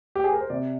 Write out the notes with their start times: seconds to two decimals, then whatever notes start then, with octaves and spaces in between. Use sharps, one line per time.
0.15 G4
0.24 G#4
0.32 A#4
0.41 C5
0.50 C3 D5